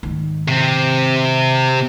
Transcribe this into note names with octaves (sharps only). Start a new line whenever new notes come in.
G#2 D#3
C3 C4